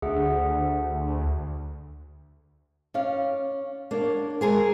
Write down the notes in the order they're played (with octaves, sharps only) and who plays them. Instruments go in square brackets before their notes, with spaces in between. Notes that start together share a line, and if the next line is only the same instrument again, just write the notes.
[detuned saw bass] D2 [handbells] G#4 E5 F#5
[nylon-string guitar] C#4 D5 F5
[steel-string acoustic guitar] A#3 [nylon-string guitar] D4 C#5
[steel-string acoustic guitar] G#3 G#4 A#4 [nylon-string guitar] C5 G#5